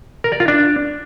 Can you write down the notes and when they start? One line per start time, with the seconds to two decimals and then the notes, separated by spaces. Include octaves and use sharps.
0.24 A#4
0.32 D5
0.40 F4
0.48 D4